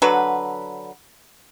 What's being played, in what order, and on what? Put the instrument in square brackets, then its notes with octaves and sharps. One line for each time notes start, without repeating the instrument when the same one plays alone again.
[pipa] D3 F#3 F#4 B4